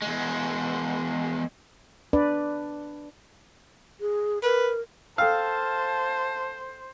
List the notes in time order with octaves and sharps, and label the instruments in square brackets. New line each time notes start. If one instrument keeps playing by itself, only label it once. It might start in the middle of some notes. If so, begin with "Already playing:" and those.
[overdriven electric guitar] E2 G#3
[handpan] D4 B4 D5
[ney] G#4
[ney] A#4 [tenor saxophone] B4
[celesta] A4 G5 E6 [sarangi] C5 [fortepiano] F5 [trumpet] A5